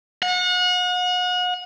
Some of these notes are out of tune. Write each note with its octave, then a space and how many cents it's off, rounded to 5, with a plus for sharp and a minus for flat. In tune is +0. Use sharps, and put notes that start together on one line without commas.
F#5 -35